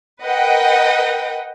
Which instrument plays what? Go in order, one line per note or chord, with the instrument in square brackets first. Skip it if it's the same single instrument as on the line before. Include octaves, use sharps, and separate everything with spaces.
[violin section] A#4 B4 D#5 F#5 G5